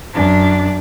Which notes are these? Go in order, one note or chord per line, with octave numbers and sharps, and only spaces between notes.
F#2 D4